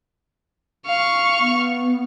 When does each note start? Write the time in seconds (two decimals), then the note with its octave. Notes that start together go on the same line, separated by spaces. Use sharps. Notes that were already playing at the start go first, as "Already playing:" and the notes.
0.87 F5 C#6
1.40 B3